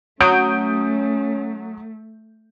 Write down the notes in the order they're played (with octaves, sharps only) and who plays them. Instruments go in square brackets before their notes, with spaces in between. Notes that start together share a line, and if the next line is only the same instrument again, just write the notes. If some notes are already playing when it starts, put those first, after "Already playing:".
[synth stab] F#3 [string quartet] A3 [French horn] C#4 [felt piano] D#6 G6 D7